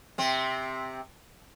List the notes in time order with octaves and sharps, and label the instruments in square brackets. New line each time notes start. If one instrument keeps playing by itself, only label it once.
[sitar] C3 C4